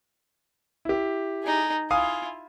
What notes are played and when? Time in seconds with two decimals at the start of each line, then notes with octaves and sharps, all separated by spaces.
0.85 E4 G4
1.43 D#4 G#4
1.91 E4 F4 F5 G#5 D#6